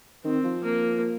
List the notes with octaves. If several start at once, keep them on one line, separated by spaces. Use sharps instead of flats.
D#3 C4
F3
A#3